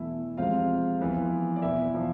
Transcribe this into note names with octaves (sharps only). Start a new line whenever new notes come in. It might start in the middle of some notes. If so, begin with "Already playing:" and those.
Already playing: E2 B2 A3 E4 E5
F2 C3 G#3 C4 F4 F5
F2 E3 B3
D5
E2 B2 B3 E4 E5
F3 F4